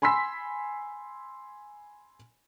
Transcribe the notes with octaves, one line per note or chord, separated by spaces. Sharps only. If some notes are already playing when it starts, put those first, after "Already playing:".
G#5 B5 C6 E6 B6